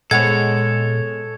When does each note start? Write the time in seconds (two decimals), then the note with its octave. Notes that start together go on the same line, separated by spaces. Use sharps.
0.11 A#2 G#3 B3 A4 C#5 G#6